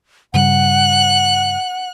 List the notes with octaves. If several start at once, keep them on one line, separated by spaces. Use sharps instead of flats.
G2 C#3 G3 F#5 F#6